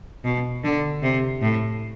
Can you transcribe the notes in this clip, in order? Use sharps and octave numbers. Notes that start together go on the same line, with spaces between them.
B2
D3
C3
A2